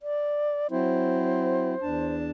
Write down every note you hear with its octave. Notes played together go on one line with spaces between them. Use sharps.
D5
F#3 C4 E4 C5
E2 D4 A5